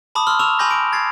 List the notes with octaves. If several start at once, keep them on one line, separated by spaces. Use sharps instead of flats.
A5 B5 D6 D#6
C6 E6 F6
C#6 E6 F6 E7 F7
G#5 B5 C6 D6 G6 A#6
D7
G#6 A6 C7